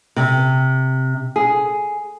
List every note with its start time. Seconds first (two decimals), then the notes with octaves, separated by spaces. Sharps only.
0.16 C3
1.36 G#4